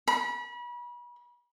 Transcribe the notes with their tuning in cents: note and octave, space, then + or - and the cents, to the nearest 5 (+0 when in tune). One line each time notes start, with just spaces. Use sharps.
B5 -35